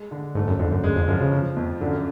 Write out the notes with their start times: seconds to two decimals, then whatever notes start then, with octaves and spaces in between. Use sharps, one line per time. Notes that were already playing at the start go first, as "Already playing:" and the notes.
Already playing: G#3
0.11 D3
0.35 G#2 A3
0.47 F#2
0.59 F2 D3
0.71 F#2
0.84 F#2 G#3
0.96 F2
1.08 F#2 F3
1.20 C#3
1.32 F3
1.56 F2
1.81 F#2 D3